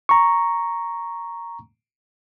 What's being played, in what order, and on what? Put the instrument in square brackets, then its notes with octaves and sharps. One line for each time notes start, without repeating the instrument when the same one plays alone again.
[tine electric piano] A#5 C#6